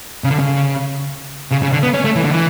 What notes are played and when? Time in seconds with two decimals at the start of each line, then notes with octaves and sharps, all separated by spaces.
0.24 C#3
0.31 D3
0.39 C#3
1.51 C#3
1.62 C#3
1.73 D3
1.83 B3
1.94 C#4
2.04 A3
2.16 E3
2.25 D3
2.31 E3